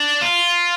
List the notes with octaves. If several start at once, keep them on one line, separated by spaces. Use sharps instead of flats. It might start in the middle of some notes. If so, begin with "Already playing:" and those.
Already playing: D4
F4